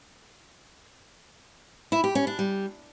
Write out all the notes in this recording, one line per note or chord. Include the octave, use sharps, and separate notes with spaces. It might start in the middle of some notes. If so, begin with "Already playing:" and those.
E4
G4
C#4
D4
G3